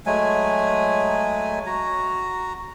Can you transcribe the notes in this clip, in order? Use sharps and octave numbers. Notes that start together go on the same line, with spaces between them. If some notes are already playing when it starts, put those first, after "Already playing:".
F#3 G#3 A3 G#5
F#4 A#5